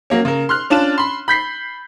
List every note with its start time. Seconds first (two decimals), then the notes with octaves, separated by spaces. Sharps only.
0.10 F#3 A#3 C#4
0.25 C#3 A#4
0.49 C6 F6 F#6
0.70 C#4 D4 F4 A5 E7
0.98 B5 C6
1.28 B5 G6 B6 C7